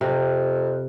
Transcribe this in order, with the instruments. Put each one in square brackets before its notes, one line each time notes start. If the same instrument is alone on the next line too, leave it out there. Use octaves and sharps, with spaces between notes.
[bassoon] F2 [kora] C3